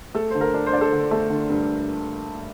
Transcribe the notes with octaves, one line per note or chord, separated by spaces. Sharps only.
A3 A4
D3 C5
A#4
D4
C5
D4 D5
A4 C5
D3
A3
D3
G2